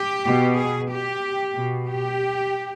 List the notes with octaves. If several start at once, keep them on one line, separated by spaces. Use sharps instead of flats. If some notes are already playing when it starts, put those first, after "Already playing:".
Already playing: G4
B2
G#4
G4
B2
G4